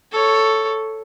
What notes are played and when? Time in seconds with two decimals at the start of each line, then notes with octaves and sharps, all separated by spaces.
0.12 A4 C#5